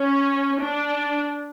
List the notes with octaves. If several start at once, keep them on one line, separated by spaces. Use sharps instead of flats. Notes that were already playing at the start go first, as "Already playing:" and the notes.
Already playing: C#4
D4